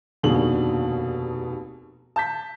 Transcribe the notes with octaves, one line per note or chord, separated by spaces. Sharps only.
F1 D#2 B2 D4 G#4 F#7
A5 G6 B6